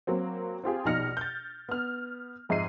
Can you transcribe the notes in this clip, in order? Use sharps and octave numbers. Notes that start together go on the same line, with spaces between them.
F#3 A#3 C4
C4 F4 G4 G#4
A#1 B2 D#4 F6 A#6 C#7
G6 A6
B3 F6
F2 G#2 D#5 E5 C7 D#7